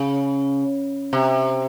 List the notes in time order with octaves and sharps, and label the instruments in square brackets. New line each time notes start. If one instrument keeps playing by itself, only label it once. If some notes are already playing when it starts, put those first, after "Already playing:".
Already playing: [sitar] C#3
C3